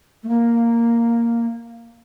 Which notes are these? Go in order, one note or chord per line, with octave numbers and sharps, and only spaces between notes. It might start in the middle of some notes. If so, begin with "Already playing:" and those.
A3
A#3